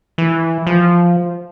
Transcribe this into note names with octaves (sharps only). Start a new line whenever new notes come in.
E3
F3